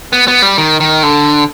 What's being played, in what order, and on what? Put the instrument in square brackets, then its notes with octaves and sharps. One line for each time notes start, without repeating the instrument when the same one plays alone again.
[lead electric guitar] B3
B3
G3
D#3
D#3
D3